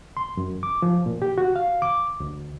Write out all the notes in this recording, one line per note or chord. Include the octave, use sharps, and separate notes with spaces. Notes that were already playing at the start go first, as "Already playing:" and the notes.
C6
F#2
D6
F3
A#2
G4
F#4
F5
D6
D2